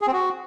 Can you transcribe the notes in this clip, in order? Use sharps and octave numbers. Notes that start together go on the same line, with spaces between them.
G#4
C4
F#4